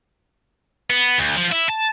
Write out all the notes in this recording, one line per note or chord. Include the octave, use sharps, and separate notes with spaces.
B3
D2
F3
E4
A5